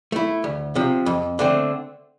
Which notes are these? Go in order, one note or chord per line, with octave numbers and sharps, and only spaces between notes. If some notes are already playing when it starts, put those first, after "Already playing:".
A3 E4
D2
C3 F3
F2
D3 A3 C4